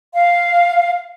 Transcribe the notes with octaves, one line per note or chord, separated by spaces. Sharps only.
F5